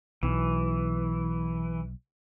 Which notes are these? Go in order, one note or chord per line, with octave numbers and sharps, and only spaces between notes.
B1 E3